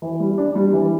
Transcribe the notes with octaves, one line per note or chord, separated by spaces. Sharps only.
E3
G3
D4
G3
E3